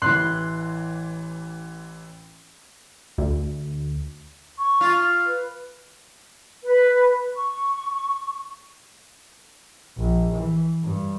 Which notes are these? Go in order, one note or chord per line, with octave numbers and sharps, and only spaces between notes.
A1 E3 C6 F#6
D2
C#6
F4
B4
B4
C#6
A#1
E3
G2